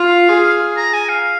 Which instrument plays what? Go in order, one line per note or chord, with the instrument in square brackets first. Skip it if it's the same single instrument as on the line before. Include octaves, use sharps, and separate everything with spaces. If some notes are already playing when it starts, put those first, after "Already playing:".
Already playing: [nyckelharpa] F4 [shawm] F5
[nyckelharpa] G#4
[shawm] A#5
G#5
F5